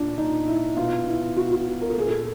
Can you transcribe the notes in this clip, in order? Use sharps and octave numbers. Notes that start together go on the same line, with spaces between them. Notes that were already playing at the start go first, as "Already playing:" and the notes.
Already playing: A#2 D4
A#2 D#4
E4
B2 F4
E4
B2 F#4
F#4
A#4
A4
A#2 G#4
A4